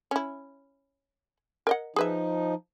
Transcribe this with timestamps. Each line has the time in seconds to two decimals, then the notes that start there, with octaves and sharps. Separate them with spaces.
0.11 C#4 E4
1.67 A#4 D#5 F#5
1.96 F3 D#4 G#4 B4 E5